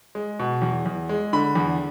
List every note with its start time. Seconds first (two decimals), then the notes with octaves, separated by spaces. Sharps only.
0.15 G#3
0.39 B2
0.62 E2
0.86 E2
1.09 G#3
1.33 D3 B5
1.55 E2